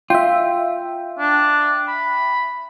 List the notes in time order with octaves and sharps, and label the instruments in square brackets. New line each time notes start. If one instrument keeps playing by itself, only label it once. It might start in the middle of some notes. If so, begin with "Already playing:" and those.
[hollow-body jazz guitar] F4 [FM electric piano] E5 G5
[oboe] D4
B5